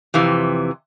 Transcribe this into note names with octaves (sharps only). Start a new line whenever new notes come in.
F2 C3 E3